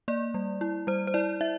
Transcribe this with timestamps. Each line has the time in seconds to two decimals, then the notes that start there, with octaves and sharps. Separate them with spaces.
0.08 A#3 D5
0.34 G3
0.61 E4
0.87 G3 C5
1.07 C5
1.14 E4 D5
1.41 E4 E5